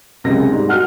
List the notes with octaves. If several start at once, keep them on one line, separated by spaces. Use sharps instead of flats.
C#2 F#2 C3 G#3 A#6
G#2 G3
F#4 F#5 F6 F#6